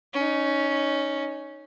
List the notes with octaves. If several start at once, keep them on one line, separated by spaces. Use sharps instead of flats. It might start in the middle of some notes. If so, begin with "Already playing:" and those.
C#4 D#4